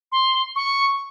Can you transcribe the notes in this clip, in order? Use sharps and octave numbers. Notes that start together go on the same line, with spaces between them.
C6
C#6